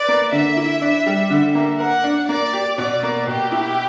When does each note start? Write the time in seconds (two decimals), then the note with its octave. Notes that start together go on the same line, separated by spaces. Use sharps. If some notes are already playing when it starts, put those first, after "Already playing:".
Already playing: B4 D5
0.08 A#3
0.32 D3 E5
0.57 E4
0.82 D4
1.06 G3
1.30 D3
1.55 A#3
1.80 A#4 F#5
2.04 D4
2.29 A#3 D5
2.53 G4
2.78 B2 D5
3.03 A#3
3.27 B2 G4
3.52 E4